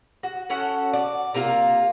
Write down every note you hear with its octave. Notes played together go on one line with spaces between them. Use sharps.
F#4
C#4 F#4 A4 F#5
D5
C3 A#3 F4 A#4